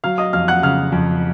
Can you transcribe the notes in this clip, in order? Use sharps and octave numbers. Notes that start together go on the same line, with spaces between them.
F#3 F5 F6
D#5 D#6
F2 F5 F6
F#5 F#6
C#3 F5 F6
F2